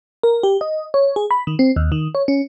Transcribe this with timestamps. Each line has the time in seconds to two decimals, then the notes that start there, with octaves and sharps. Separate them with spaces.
0.23 A#4
0.43 G4
0.61 D#5
0.94 C#5
1.16 G#4
1.31 B5
1.47 D#3
1.59 C4
1.76 D#2
1.92 D#3
2.15 C#5
2.28 C#4